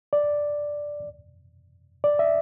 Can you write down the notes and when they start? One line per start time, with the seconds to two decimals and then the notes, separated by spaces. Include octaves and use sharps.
0.13 D5
2.04 D5
2.19 E5